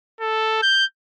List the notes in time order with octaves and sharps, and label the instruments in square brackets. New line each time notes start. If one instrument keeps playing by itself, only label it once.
[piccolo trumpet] A4
G6